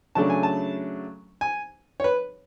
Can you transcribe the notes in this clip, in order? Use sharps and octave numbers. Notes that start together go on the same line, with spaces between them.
C#3 F#3 A3 D4 A5
G#5
A5
G#5
C#5
B4